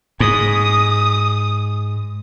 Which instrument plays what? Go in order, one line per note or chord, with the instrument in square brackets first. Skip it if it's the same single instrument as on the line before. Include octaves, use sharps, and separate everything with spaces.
[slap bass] G#2 [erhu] D#6